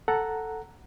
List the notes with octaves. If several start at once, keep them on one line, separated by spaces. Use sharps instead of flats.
A4 F#5 A#5